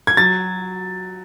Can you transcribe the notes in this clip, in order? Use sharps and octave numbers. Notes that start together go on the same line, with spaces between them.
G#6
F#3 A6